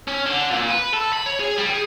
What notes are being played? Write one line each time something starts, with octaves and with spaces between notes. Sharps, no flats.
C#4
D3
A#2
B4
A4
B5
C#5
G#4
G3
G#4